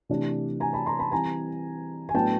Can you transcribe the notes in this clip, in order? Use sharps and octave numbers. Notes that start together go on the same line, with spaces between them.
C3 E3 A3 D4
G#5 A#5
A5 B5
A#5 C6
A5 B5
E3 G3 C4 G#5 A#5
G#5
A2 F#3 B3 D4 G5 A5